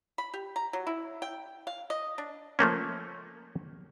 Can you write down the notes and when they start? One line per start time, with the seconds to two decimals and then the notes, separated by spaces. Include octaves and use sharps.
0.18 B5
0.34 G4
0.56 A#5
0.73 F#3
0.87 E4
1.22 G5
1.67 F5
1.90 D#5
2.18 D4
2.59 F3 A3 A#3 C#4